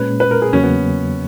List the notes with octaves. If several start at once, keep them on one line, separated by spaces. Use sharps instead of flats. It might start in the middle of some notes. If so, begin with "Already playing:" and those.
Already playing: A#2 G#3 C#4 B4
B4
A#4
G#4
E2 C#3 F#3 A#3 C#4
B3